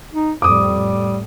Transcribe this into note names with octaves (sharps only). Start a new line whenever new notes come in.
D#4
F2 A2 G3 D6 D#6
A2